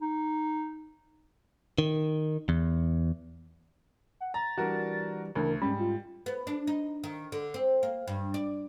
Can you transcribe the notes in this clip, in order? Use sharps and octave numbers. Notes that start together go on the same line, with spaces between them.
D#4
D#3
E2
F#5
A#5 A6
E3 G3 D4 F#4 A#4
D2 C#3 E3 D4 A#4
G#2 G3 C#4 B5
F4
B3
D4
D#4
D#3
D3
C4
A#3
G2
D5